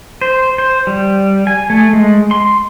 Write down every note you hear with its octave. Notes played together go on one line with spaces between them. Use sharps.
C5
C5
G3
G#5
A3
G#3
C6